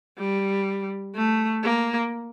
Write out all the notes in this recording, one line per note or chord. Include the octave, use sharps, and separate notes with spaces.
G3
A3
A#3